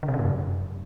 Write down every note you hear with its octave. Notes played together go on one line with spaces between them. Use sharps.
D3
C3
C#3
A2
F#2